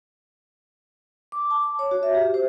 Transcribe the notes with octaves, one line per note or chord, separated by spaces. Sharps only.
D6
A5
D6
C#5
F#4
E5
G4
C5